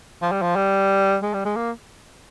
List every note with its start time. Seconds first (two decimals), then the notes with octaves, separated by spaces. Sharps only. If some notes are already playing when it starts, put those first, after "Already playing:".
0.22 F3
0.32 G3
0.42 F3
0.56 G3
1.23 G#3
1.33 G3
1.45 G#3
1.56 A#3